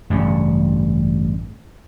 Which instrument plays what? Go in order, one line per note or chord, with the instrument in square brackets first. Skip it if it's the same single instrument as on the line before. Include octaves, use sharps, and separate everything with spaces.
[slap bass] A1 G2 A#2 C#3